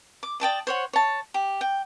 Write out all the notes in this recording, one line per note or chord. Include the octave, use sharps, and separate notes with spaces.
D6
D5 G5 A5 D#6
C5 C#5 F#5
C#5 A5
G4
G5